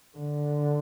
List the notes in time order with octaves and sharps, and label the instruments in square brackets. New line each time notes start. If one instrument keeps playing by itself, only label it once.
[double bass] D3